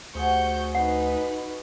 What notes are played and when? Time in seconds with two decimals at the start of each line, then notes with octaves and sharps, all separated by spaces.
0.15 D2 F#4 G#4 C5 C#6 G6
0.75 D#4 B4 F#5